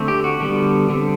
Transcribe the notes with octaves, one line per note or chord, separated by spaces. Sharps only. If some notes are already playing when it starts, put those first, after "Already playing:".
Already playing: D3 A3 C4
G4
F#4
D3 G3 B3
D3 G3 C4